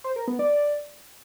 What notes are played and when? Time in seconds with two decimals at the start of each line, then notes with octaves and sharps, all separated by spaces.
0.04 C5
0.16 A#4
0.28 B3
0.39 D5